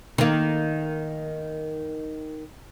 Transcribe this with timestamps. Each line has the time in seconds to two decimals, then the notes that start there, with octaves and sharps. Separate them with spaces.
0.18 D#3 A#3